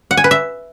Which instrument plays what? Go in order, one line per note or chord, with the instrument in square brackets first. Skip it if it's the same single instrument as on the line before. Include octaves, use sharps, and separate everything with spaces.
[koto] F#5
G#5
B4
E5